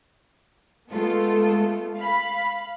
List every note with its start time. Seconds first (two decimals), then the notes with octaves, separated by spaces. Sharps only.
0.90 G#3 A3 B3 F4 A4
1.96 F5 B5